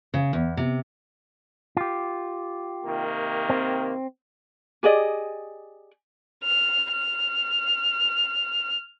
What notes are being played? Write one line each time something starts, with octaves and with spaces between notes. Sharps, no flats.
C#3
E2
C3
F4 G4
C3 D#3 A#3
C4
G4 G#4 D5 D#5
F6
F6